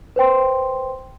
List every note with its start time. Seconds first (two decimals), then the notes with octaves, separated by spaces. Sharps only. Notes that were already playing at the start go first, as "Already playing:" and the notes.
0.16 B4 C5 G5 C6